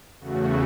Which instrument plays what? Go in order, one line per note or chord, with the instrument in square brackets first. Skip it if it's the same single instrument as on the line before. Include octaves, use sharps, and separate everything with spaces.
[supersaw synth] E2 C#3 A3 F#4